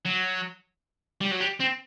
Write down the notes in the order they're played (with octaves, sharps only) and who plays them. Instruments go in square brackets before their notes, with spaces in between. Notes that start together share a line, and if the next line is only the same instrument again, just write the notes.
[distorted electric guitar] F#3
G3
F#3
G3
C4